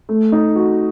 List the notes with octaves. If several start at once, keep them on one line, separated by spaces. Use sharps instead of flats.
A3
D#4
F#4